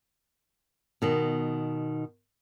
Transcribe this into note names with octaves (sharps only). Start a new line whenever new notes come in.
B2 D#3